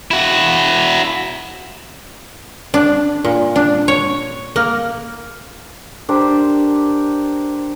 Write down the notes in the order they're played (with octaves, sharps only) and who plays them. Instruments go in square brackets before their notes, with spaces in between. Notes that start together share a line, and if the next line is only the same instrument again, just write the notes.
[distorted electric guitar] E4 F#4
[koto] D4
A#2
D4
C#5
A#3
[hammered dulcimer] D4 G4 A#4 C5